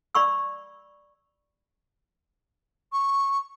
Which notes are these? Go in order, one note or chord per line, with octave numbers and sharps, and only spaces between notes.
D5 B5 C#6 E6
C#6